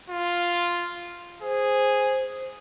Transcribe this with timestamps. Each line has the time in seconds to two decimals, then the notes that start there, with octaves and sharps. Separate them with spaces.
0.10 F4
1.42 G#4 C5